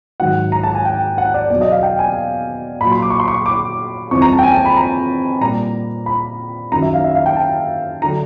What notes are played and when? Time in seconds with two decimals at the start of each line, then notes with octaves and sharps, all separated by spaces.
0.20 G#2 D#3 F#3 F#5
0.52 A#5
0.63 A5
0.75 G#5
0.85 G5
1.18 F#5
1.34 D5
1.50 E2 B2 F#3 D5
1.61 D#5
1.72 F5
1.83 G5
1.99 G#5
2.80 A#2 F#3 B5
2.92 C6
3.02 D6
3.10 C#6
3.20 C6
3.28 C#6
3.46 D6
4.11 F2 C3 E3 G3 C#6
4.22 A#5
4.33 A5
4.39 G5
4.43 G#5
4.55 A5
4.65 B5
4.77 A#5
5.41 A#2 G3 A#5
6.06 B5
6.72 F#2 D#3 F#3 A#5
6.82 E5
6.94 F5
7.04 E5
7.15 F5
7.26 G5
7.36 A5
8.02 D3 F#3 A#5